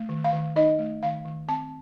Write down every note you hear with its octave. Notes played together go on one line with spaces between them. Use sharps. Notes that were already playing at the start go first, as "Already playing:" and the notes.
Already playing: A3
D#3
F5
D#3
D#4 D#5
A3
D#3 F5
D#3
C4 A5